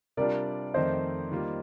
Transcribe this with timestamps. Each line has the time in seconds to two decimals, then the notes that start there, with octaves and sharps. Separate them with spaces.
0.17 C3 G3 D4 F4 A#4 D5
0.74 F2 D#3 A3 C4 C5 D#5
1.32 D#3 G3 A#3 F4